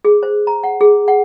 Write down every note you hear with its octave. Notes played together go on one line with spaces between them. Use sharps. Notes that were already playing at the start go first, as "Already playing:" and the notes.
G#4
C5
A#5
F#5
G#4
F#5